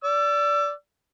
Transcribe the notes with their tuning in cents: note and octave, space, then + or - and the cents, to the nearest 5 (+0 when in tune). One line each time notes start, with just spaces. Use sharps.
D5 -15 E6 +30